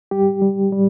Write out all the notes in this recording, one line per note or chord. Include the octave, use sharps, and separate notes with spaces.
G3 G4
G3
G3